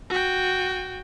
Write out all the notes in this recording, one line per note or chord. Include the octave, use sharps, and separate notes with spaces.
F#4 G5